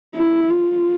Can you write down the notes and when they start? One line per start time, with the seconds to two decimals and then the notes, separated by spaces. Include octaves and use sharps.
0.15 E4
0.51 F4